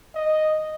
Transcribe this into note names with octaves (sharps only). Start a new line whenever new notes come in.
D#5